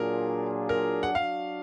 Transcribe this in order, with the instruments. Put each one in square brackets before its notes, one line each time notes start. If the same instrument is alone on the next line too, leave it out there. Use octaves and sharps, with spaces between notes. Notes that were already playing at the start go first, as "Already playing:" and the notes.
Already playing: [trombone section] A#2 F#3 D4 F4 G#4 [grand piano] A#4
[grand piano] A#4
F#5
[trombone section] F#3 D4 F#4 [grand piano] F5